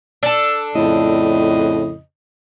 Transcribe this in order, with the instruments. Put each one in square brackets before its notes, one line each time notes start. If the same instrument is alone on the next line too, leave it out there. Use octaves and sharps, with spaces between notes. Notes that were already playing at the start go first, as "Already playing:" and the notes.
[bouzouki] D4 A4
[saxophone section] F2 C#3 D#5 [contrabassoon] A2